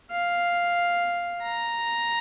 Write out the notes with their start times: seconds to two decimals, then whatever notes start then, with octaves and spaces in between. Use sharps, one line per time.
0.11 F5
1.42 A#5